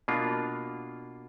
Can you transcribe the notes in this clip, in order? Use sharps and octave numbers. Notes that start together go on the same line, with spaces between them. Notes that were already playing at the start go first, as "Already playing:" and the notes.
B2 A#3 D4 F4